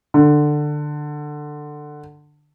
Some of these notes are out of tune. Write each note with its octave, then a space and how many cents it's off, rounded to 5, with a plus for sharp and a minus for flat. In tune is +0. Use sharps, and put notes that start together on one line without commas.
D3 +15